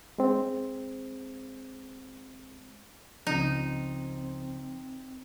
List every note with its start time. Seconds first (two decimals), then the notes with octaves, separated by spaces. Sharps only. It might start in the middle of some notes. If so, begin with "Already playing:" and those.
0.18 G#3 C4
3.27 C#2 C#3 F3 C4 D#4